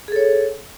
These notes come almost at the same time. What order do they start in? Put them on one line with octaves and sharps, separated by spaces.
G#4 A4 C#5